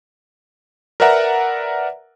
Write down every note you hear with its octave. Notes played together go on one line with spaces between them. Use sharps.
A#4 B4 D5 E5 F#5 A#5